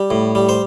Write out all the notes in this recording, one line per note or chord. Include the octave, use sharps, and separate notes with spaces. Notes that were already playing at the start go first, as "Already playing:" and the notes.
Already playing: G3
A2
G3
C5